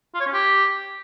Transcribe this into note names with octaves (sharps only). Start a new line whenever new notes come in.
F4
C#5
C#4
G4